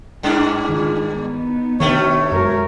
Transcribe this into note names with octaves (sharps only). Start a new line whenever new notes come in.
G2 G#3 C#4 D4
D#3 F4
B3 D#4
B2 D#3 A3 D4 C#5
F#2 G#3 F#4 A#4